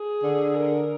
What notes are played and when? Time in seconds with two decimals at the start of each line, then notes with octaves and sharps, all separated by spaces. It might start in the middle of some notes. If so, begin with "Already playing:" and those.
Already playing: G#4
0.23 D3
0.54 A#4